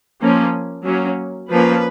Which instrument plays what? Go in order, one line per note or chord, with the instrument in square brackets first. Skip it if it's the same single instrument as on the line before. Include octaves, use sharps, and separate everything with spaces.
[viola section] F3 A#3 C#4
F#3 A#3 C#4
F3 A#3 C#4 B4